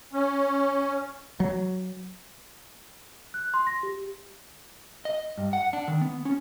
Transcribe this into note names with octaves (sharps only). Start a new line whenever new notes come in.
C#4
F#3
F#6
C6
A#6
G4
D#5
G2
F#5
D4
D#3
B3
C#4